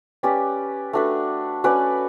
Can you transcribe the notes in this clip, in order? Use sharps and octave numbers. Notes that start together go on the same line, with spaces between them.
C#4 G4 B4 D5
A3 D4 F#4 B4
C#4 F#4 B4 D5